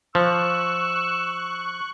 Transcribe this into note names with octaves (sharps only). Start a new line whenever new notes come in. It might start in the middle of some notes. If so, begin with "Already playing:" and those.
F3 C#6 E6 F#6